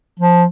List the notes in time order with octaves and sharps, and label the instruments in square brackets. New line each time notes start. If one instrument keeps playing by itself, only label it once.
[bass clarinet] F3